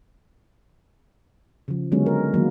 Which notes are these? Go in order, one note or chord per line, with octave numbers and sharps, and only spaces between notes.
C#3 F3
D3 F#3 G#3 B3 C#4
A#4
D#3 F#3 A#3